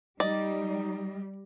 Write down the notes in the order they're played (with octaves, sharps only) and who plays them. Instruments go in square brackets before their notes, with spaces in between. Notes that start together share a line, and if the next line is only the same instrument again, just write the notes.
[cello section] G3 [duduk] D#4 [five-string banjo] D5 [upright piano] D#5